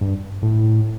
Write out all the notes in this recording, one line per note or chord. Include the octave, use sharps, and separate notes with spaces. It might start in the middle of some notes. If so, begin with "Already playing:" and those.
G2
A2